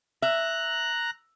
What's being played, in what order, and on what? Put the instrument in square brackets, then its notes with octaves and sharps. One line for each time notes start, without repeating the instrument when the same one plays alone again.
[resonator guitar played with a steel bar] E5 [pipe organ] A#5 F#6